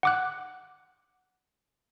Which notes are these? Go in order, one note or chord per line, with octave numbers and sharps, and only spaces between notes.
F#5 D6 F#6